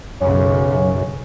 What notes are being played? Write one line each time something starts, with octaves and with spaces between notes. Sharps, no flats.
B1 F#2 C#3 C#4